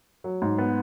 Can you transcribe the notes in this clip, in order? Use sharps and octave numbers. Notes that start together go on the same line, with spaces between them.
F#3
G#2
B3